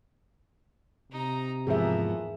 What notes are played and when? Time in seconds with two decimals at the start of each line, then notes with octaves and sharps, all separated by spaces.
1.12 C3 D#4 A#5
1.67 E2 G#2 F3 A#3 B3 G#4 E5